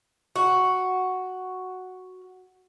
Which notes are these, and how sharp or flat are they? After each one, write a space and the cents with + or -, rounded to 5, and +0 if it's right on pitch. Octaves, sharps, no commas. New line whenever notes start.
F#4 +0